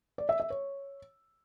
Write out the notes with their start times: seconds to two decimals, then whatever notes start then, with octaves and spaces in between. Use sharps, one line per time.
0.18 D5
0.29 E5
0.40 E5
0.50 C#5